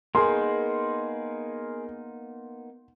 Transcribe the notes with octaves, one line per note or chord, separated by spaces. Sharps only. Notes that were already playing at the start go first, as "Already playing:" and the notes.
A#3 B3 D#4 G#4 A#4 C6